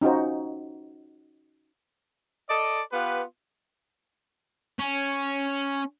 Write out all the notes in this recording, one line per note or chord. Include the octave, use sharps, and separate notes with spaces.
C#4 D#4 F4 F#4 C5
A4 D5 D#5
B3 F4 G4 B4
C#4